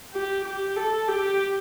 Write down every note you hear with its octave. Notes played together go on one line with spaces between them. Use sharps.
G4
G4
A4
G4